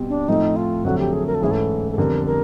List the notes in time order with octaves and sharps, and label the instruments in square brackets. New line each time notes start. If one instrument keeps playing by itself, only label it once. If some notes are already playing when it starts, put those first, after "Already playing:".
Already playing: [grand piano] B2 G3 C4
[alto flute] D4
[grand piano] A2 F3 A3 C4 [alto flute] D#4
[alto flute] F4
[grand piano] F2 D3 F#3 A3 [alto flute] F#4
[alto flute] G4
G#4
A#4
A4
[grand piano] G#2 E3 A3 C#4 E4 [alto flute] G#4
[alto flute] A4
A4
[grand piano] F2 D3 G3 B3 [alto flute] A#4
[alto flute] A#4